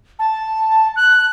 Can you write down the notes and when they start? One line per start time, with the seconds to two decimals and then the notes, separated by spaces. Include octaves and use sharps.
0.19 A5
0.96 F#6